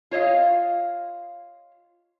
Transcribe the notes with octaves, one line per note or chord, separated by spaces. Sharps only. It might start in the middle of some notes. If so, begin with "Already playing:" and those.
F4 C#5 D#5 F5